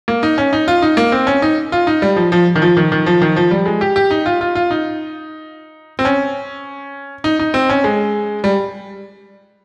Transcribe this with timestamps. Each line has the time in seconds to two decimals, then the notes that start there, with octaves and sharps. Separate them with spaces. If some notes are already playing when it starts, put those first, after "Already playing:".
0.08 A#3
0.23 D#4
0.38 C#4
0.53 D#4
0.68 F4
0.82 D#4
0.97 A#3
1.12 C4
1.27 C#4
1.42 D#4
1.72 F4
1.87 D#4
2.02 G3
2.16 F3
2.32 F3
2.56 D#3
2.62 F3
2.77 D#3
2.92 D#3
3.06 F3
3.22 D#3
3.36 F3
3.51 G3
3.66 G#3
3.81 G4
3.96 G4
4.11 D#4
4.26 F4
4.41 F4
4.55 F4
4.71 D#4
5.99 C4
6.05 C#4
7.24 D#4
7.39 D#4
7.54 C4
7.70 C#4
7.84 G#3
8.44 G3